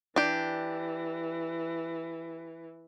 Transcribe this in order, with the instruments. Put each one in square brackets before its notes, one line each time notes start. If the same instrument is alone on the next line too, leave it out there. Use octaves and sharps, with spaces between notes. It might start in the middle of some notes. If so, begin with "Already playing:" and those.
[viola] E3 [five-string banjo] D4 G4